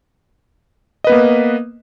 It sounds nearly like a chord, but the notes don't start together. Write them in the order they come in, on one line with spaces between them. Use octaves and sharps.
D#5 B4 B3 A#3